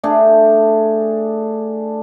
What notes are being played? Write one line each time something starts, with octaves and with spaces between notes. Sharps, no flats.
A3 D4 G4 G#4